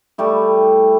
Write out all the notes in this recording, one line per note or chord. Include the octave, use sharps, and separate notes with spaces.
G3 A3 E4